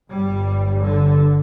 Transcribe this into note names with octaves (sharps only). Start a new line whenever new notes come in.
G1 G2 G3
D3